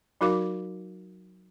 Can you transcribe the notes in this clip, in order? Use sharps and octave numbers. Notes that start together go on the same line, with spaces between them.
F#3 D#4 F#4 A#4 F5 D6